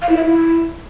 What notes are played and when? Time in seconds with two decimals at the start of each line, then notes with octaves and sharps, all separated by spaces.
0.02 F5
0.09 E4
0.17 E5
0.24 E4